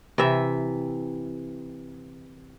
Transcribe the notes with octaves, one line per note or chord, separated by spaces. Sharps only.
C3 E3 E5